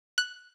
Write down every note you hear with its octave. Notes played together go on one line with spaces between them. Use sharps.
F#6